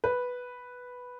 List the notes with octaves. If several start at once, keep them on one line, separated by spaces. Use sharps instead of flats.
B4